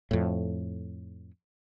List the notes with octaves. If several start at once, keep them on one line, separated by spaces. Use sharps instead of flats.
F2 A2